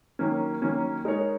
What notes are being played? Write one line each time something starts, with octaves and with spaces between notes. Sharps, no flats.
D#3 F#3 A#3 C#4
D#3 F#3 A#3 C#4
G#3 D#4 A#4 C#5